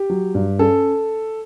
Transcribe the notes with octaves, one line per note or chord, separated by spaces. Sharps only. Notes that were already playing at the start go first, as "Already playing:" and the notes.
Already playing: G4
F#3
G2
C#4 A4